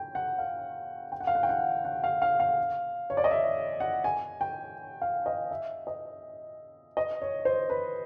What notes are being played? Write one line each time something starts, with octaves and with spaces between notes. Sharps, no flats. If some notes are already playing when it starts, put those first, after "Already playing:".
Already playing: G5
F#5
F5
G5
F#5
F5
F#5
G5
F#5
F#5
F5
F5
F5
C#5
D5
D#5
E5
F#5
G#5
G5
F5
D#5
E5
D#5
D#5
C#5
C5
B4